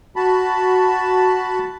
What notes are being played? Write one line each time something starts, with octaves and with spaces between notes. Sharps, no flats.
F#4 A5 B5